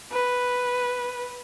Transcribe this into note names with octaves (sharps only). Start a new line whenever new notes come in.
B4